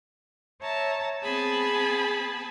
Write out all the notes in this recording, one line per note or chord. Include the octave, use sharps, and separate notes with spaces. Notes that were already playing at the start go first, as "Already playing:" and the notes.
C#5 E5 A5 A#5
B3 C4 G#4 G#5 A5 B5